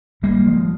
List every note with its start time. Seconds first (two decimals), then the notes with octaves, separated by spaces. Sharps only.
0.22 G#1 G3 A#3
0.46 F3 G#3